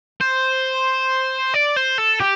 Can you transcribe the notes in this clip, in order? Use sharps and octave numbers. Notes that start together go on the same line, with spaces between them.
C5
D5
C5
A4
G4